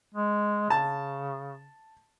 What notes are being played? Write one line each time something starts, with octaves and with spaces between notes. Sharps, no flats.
G#3
C#3 A5